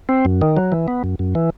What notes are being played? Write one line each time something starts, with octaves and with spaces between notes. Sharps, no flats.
C4
F#2
D#3
F#3
E3
B3
F#2
F#2
E3